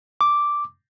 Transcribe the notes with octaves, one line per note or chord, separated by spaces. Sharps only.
D6